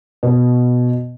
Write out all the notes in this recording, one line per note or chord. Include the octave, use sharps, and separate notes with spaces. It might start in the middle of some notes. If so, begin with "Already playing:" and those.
B2